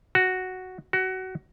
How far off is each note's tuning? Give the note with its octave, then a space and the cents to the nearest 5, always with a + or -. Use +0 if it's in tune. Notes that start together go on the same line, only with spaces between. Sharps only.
F#4 +0
F#4 +20